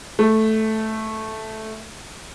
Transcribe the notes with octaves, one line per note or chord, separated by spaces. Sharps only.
A3